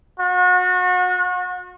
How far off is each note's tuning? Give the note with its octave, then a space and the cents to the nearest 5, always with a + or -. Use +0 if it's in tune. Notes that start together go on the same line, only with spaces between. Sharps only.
F#4 -35